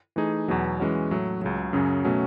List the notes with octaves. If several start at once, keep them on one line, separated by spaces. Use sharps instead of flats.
E3 A3 D#4 G#4
E2 B2 F#3 B3
E3 G#3 C#4 F#4 C#5
A2 F#3 A3
C#2 C#3 F#3
F#2 C#3 F#3 C#4
B2 F#3 A3 C#4